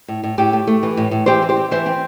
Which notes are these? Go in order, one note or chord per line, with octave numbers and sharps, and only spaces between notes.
A2
A2
A2 G4
A3
A3
E3
A2
A2
E3 G4 C5
C4
G4 C5
C4
E3 C5 E5
C4